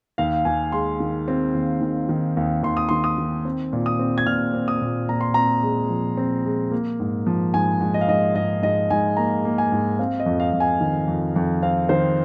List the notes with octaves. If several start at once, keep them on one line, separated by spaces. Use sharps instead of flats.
D#2 F5
D#2 G#5
G#3 C6
D#3
C4
D#2
D#3
D#3
D#2
D#2 C6
D#6
D#3 C6
D#6
D#3
C4
A#2
D#6
C4
G#6
A#2 F6
C4
D#6
A#2
A#2 A#5
C6
C4 A#5
G#3
F3
C4
G#3
A#3
G#2
F3
G#2 G#5
G#2
D#5
F5
G#2 D#5
G#2 D#5
G#2 D#5
G#2 G#5
A#3 A#5
A#3
G#5
G#2
C4 F5
D#5
F2
F5
F2
G#5
D#3
F2
F2
C4 F5
D#3 C5